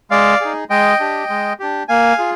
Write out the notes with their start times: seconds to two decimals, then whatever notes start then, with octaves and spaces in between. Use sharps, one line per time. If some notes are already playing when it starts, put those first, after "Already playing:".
0.11 G#3 D5 F5
0.41 D#4 G#4
0.70 G#3 D#5 G5
1.00 D4 G4
1.30 G#3
1.60 D4 G4
1.88 A#3 F5 G#5
2.18 F4 G#4